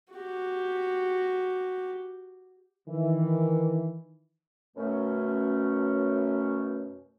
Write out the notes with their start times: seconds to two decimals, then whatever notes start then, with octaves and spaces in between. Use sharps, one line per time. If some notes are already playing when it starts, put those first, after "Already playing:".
0.14 F#4 G4
2.88 D#3 E3
4.76 F#2 B2 A3 C#4